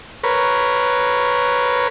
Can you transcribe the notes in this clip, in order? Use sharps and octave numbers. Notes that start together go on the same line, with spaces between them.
A#4 B4 C#5